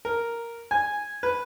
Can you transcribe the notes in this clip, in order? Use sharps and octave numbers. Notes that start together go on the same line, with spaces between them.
A#4
G#5
B4